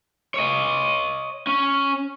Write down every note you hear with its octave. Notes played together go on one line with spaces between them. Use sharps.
C#5 D#5
C#4